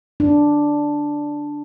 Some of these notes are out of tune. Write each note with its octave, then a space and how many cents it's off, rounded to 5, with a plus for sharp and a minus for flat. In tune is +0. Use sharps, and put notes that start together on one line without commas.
D4 +0